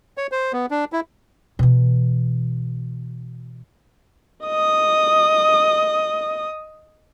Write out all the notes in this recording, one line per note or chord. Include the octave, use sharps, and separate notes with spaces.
C#5
C5
B3
D4
E4
B2 E3
D#5 D#6